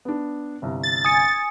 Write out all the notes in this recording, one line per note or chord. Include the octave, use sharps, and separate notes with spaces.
B3 D4
G1 C2
A6
G#5 D#6 C#7